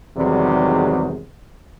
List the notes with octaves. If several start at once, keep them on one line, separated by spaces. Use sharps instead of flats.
E2 G#2 C3 D#3 F#3 G3